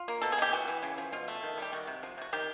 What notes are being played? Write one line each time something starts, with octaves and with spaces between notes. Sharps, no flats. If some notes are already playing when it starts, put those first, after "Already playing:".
Already playing: F4
A#3
B2 A4
G#4
B2 G4
E3 F#4
E3
C#3
F3
B2 F4
A3
D#3
G3 G4
D#3 F#4
C3
F3
C3 F#4
D#3 G4